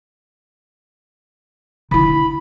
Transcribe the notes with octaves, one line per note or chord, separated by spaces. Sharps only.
D3 E4 B5